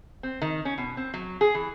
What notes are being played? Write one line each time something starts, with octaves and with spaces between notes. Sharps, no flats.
C4
D#3
C#4
B2
C4
F#3
G#4
E3